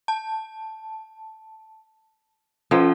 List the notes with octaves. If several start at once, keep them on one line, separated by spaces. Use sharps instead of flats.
A5
F3 C#4 F4 A4